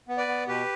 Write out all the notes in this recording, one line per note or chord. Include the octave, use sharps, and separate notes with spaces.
B3
B4 D5
B3
B2 G4 B4